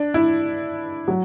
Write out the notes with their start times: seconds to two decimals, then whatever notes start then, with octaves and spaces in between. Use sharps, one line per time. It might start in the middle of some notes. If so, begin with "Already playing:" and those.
Already playing: D4
0.14 E4
1.08 F#3